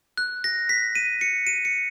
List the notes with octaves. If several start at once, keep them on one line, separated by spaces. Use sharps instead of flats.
F#6
A#6
B6
D#7
C#7
D#7
C#7